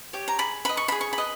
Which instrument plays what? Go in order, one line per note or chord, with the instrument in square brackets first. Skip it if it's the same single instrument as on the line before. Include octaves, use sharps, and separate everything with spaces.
[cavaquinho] G4 C#5
A#5
G#4 B5
B4 D#5 B5
C#6
G#4 B5
C#6
B5
B4 D#5